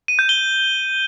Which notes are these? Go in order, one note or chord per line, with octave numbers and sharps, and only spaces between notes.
D#7
G6
G7